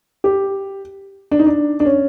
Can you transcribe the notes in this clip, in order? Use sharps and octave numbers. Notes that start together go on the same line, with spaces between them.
G4
D4
D#4
D4
D4
C#4